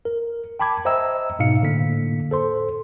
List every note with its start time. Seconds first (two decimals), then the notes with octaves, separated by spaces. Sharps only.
0.05 A#4
0.59 G5 A5 B5 D6 G#6
0.85 C5 D#5 E5 G5 A#5 E6
1.39 G#2 B2 D#4 F5 C#7
1.62 A2 D3 A#3 B6
2.31 A4 C5 C6